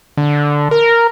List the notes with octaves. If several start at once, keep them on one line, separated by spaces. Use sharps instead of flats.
D3
A#4